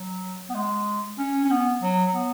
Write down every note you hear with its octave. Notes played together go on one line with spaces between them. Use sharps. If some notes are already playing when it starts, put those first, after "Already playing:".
Already playing: F#3
B3
G#3
C#4
C#4
B3
F#3
B3